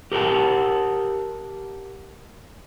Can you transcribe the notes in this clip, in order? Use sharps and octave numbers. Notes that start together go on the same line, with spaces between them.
G4 A#4 B4 F#5 A5